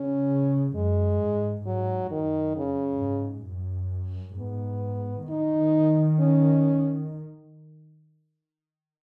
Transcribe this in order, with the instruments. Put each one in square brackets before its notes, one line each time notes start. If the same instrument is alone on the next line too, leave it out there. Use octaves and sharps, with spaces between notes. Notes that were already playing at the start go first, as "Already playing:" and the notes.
Already playing: [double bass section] C#3 [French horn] C#4
[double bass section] F#2 [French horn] G#3
[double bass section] G#2
[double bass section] G#2 [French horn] F#3
[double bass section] F#2 [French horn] D#3
[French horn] C#3
[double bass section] G#2
F#2
[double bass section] G#2 [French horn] B3
[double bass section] D#3 [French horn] D#4
[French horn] C#4